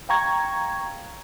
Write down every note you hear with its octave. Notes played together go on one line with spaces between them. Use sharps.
F5 G5 A#5 C#6 G#6